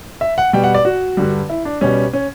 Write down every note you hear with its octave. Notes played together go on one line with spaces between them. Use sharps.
E5
F#5
B2 G3 G5
F#5
D5
F#4
G2 D3 G3
E4
D4
B2 G3 C#4
C#4